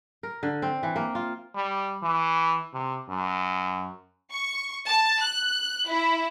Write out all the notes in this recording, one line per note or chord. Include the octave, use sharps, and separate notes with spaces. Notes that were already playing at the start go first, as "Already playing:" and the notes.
A#4
D3
C4
E3
A#3
F4
G3
E3
C3
F#2
C#6
A5
F#6
E4